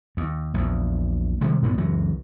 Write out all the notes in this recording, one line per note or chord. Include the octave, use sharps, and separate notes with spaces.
D#2
A#1 E2
C3 D#3 G3 G#3
G2 A#2 B3
C#2 F#2 E3 F#3